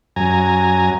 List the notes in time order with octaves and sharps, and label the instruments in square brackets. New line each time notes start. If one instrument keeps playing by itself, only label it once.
[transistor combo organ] F#2 G#5 A#5